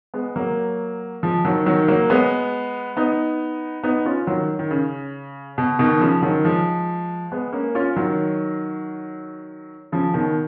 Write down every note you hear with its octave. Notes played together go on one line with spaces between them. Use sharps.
G#3 B3
F#3 A#3
F3 G#3
D#3 F#3
D#3 F#3
F#3 A#3
G#3 B3
B3 D#4
B3 D#4
C#4 F4
D#3 F#3
D#3
C#3
B2
B2 D#3
C#3 F3
D#3 F#3
F3 G#3
G#3 B3
A#3 C#4
C#4 F4
D#3 F#3
C#3 F3
B2 D#3